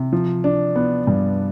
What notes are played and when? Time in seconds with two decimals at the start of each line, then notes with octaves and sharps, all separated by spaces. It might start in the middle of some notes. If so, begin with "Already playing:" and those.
Already playing: C3
0.13 F3
0.44 D4
0.76 B3
1.07 G2